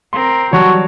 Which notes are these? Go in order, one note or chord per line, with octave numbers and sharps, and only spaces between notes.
C4 A#4 C6
E3 F#3 G3 F#4 C#5 A5